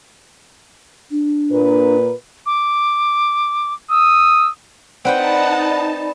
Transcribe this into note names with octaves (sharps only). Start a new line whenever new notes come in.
D4
A#2 A#3 B4
D6
D#6 E6
C4 D#4 B4 D5 F#5 G5 A5 B5